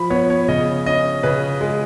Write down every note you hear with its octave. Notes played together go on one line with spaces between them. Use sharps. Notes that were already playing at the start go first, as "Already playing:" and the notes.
Already playing: F3 B5
B3 C#5
C#5
C#3 D#5
C#4 D#5
C#3 B4
G#3